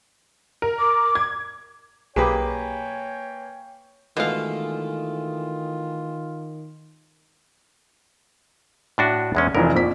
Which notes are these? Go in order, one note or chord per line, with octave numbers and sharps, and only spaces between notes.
A#4
D6
G#6
B1 A#3 G4 G#4 B4 C#5 G5 G#5
B2 D#3 E3 G#3 A3 F4 F5
A2 D4 F#4
E2 G#3 C#4
F1 F2 E3 A#4
A#1 F2 B6